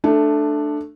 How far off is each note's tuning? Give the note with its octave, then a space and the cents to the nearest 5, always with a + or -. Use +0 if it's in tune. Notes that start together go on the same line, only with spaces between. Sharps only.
A3 +0 D4 +15